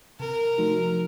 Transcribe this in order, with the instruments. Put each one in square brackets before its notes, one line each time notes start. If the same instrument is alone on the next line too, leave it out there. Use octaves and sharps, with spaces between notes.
[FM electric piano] C3 [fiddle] A#4
[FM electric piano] F3 A3 D#4 F#4